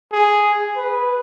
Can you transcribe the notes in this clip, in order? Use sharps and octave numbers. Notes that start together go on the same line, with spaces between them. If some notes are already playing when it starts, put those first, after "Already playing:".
G#4
B4